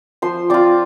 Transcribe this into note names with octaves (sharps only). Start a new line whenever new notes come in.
F3 C5 C6
C4 F4 D5 D6